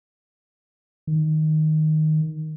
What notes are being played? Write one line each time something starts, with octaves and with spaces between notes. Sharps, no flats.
D#3